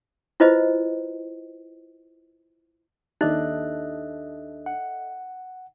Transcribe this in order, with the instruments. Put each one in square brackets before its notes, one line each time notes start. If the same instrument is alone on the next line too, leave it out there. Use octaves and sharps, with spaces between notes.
[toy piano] E4 F4 B4 C5 D#5
[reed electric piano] D#2 D4 F#6 [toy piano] D#4 [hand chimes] A4 D#5 E5
[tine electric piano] F#5